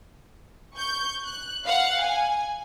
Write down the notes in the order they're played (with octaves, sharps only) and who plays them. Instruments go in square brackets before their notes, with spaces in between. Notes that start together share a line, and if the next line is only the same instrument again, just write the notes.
[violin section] C#6 G6
F#6
F5 F#5
G#5